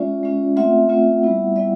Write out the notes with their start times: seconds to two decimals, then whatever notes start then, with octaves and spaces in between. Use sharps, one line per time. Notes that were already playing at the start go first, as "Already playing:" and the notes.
Already playing: G#3 C#4 F4 D5 E5
0.23 G#3 C#4 F4
0.56 A3 C4 F4 E5 F#5
0.89 A3 C4 F4
1.23 G3 B3 E4
1.56 G3 B3 E4 D5 E5